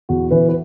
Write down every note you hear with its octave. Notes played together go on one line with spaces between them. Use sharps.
E2 F#4
E3 B3 B4
B4